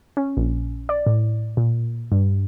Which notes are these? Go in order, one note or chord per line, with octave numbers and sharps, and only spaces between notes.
C#4
A#1
D5
A2
A#2
G2